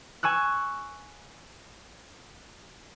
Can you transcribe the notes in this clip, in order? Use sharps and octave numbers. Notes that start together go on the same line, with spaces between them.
G#5 C#6 E6 F#6